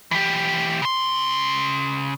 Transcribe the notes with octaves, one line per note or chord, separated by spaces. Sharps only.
E3 G4
C#3 C6